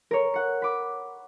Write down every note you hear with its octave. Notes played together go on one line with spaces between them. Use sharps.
A#4 C#5
F#5 C#7
B5 D6